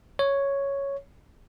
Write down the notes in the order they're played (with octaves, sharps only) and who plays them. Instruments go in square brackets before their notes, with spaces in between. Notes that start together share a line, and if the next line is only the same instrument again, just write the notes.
[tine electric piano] C#5